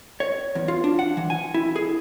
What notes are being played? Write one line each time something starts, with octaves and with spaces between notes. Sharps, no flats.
C#5
E2
F4
D4
F#5
E3
G#5
E4
G#4